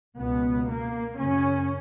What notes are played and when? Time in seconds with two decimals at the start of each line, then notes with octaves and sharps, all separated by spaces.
0.18 C#2 B2 B3
0.69 A#3
1.19 F#2 C#3 C#4